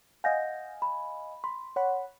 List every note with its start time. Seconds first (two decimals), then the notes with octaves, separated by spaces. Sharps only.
0.24 D#5 F5 F#5 G#5 G6 A#6
0.82 B5
1.44 B5 C6
1.76 C#5 F#5 B5